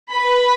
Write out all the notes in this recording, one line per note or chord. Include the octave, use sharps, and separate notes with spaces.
B4 B5